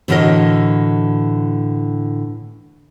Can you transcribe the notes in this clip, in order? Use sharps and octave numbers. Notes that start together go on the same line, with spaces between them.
A2 D3 E3 F#4 A#4 D#5